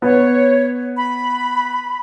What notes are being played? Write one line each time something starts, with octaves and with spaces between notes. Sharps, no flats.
B3 C#5
B5